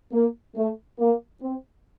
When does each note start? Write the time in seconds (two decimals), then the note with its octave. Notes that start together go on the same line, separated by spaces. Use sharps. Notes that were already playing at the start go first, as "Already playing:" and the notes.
0.12 A#3
0.56 A3
0.99 A#3
1.41 C4